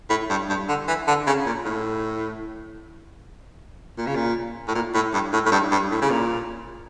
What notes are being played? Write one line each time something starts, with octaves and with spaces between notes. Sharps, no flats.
A2
G2
G2
D3
E3
D3
C#3
A#2
A2
A#2
C#3
A#2
A2
A#2
A2
G2
A2
A2
G2
G2
A2
C#3
A#2